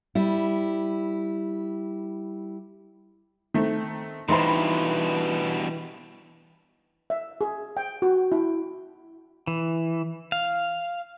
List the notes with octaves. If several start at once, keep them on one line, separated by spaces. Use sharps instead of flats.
G3 E4
D#3 A3 C4
G2 B2 E3 D#4 C5 B5 C6
E5
G#4
G5
F#4
E4
E3
F5